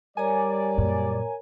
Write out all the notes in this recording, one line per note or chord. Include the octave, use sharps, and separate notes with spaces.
G3 A#4 C#5 D5 G#5 A#5
F#2 A#2